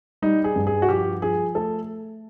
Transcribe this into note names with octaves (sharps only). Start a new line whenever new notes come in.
G3 D#4
G#4
G2
G#4
F#4
F3 G4
F3 G#4
A3 A4